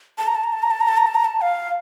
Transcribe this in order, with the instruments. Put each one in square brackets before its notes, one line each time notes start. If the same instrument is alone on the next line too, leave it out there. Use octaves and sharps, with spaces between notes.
[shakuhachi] A5
A#5
A5
A#5
A5
A#5
A5
A#5
A5
A#5
A5
A#5
A5
F5